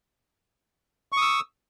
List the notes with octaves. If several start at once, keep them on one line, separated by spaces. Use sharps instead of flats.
C#6 D#6 E6